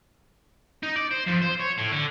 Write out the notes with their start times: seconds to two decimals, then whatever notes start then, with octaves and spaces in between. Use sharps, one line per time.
0.83 D#4
0.96 D5
1.11 C5
1.27 F2
1.42 C5
1.60 C#5
1.78 A2
1.92 D3